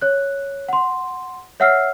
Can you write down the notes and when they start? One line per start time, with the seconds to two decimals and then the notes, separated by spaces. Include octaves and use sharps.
0.01 C#5 F#6
0.68 F#5 C6
1.60 C#5 E5 F#5 E6 F6 C7